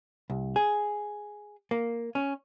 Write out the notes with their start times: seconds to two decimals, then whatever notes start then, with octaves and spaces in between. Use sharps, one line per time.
0.30 C2
0.56 G#4
1.71 A#3
2.15 C#4